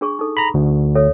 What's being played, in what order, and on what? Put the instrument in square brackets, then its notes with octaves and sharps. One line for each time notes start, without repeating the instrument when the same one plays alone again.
[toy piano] D4 G#4 C#6
D#4 A4
[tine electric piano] A#5 B5
D2
[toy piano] A4 C#5 E5